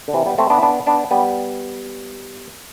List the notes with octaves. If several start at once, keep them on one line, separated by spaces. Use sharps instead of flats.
D3
C3 E3
G3 B3
A3 C4
B3 D4
E4
B3 D4
B3 D4
G3 B3